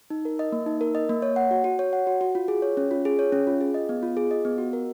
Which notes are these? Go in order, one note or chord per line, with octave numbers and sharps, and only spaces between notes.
D#4
A#4
D#5
A#3
D#4
A#4
D#5
A#3
C#5
F#5
F#4
F#4
C#5
F#5
F#4
F#4
F4
G#4
C#5
C#4
F4
G#4
C#5
C#4
F4
G#4
D#5
B3
F4
G#4
D#5
B3
F#4
A#4